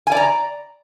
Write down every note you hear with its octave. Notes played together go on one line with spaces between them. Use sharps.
D5 G#5 A#5